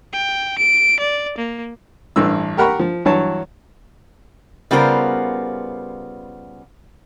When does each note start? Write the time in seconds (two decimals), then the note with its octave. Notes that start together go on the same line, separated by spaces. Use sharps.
0.13 G5
0.58 D7
0.99 D5
1.38 A#3
2.16 A1 G2 E3 E6
2.57 G4 A#4 F#5 B5 C#6
2.79 F3
3.05 G2 E3 F#3 C#5 A5
4.71 C#3 G3 B3 F4 A#4 C5